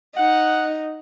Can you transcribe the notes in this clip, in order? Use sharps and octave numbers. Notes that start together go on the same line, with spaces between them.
D#4 F#5